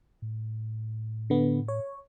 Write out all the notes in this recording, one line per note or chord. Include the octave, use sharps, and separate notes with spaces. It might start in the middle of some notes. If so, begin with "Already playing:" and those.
A2
D3 B3
C#5